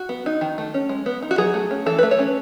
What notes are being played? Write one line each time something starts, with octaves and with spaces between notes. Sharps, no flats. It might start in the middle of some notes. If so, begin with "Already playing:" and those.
Already playing: F#4
B3
D#4
D#3
A3
C#4
G#3
B3
D#4
F#4
F#3 G#4
A3
C#4
E3 A4
A3 B4
C#5
C#4